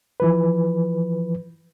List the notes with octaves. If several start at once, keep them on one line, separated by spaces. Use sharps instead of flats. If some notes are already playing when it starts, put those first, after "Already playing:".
E3 F3 B4